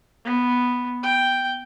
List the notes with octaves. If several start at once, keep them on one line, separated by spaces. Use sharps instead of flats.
B3
G5